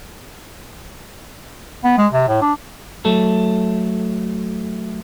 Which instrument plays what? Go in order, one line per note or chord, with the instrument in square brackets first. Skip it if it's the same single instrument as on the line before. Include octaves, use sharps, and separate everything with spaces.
[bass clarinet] B3
G#3
C3
A2
D4
[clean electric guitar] F#3 A3 A4